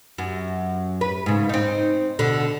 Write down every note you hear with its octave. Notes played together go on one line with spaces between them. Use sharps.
F#2
B4
G#2 C#3
C4 D#4
B2 D3